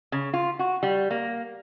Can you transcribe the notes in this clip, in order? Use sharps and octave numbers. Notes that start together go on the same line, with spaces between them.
C#3
F4
F#4
G3
A#3